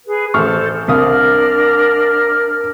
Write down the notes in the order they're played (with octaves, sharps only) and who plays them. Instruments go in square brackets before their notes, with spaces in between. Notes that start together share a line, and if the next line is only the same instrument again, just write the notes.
[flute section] G#4 B4
[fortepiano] A1 C#6 F6 [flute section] A4 C5
[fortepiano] C2 F5 D#6 [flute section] D4 A#4 F6